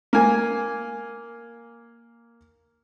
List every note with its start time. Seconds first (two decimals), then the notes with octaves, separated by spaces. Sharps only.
0.13 A#3 G#5